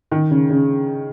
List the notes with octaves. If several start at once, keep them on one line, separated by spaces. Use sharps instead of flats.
D#3
C#3
C#3